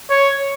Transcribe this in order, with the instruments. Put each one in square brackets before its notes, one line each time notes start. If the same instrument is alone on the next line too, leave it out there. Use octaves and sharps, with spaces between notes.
[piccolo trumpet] C#5